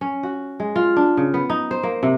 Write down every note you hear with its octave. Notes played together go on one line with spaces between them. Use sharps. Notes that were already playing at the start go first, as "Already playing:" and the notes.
C#4
F#4
G#3
F4
D4
C#3
B3
D#4
C5
A#3
C3